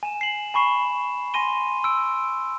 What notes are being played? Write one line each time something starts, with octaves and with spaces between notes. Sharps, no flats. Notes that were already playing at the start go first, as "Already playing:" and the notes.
G#5 E7
C7 F#7
G#5 B5 C#6 C7 E7
G#5 C6 A#6 D#7 G7
C6 E6 D7